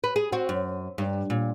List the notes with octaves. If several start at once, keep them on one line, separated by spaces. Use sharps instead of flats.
B4
G#4
C4 F#4
F#2
G2
A#2